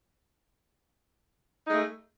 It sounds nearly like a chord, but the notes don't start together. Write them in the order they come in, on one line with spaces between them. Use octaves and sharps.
D#4 G#3 A3